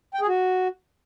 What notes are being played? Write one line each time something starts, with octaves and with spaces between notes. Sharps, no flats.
G5
G#4
F#4